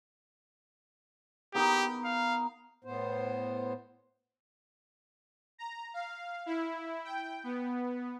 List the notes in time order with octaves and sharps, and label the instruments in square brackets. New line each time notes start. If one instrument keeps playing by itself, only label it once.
[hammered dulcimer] B3 D#4 A#4 [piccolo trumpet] G4
[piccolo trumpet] F5
[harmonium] A2 B3 C5
[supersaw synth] A#5
F5
E4
G5
B3